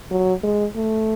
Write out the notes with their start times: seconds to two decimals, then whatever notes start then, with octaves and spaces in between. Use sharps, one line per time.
0.11 F#3
0.44 G#3
0.76 A3